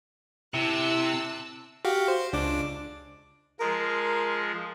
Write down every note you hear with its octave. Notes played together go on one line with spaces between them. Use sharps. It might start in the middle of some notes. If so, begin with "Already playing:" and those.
C3 E4 A5 E6 F#6
F#4 G4 F5
C5
C#2 D4 D6
F3 G#3 A#4